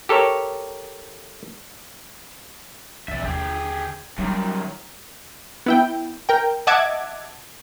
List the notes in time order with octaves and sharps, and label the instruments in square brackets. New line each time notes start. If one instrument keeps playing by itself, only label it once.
[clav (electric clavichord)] G4 A4 A#4 C#5
[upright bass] C#2 C3 [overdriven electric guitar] D5 E5
[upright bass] D#2 D3 [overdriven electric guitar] G4 G#4
[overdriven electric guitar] F#2 D#3 [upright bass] F#3 G3
[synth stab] B3 E4 G5
A#4 G5
D#5 E5 F#5 A5 D6 G#6